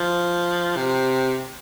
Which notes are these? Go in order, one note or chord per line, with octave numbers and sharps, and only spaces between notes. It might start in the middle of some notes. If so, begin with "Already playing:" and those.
Already playing: F3
C3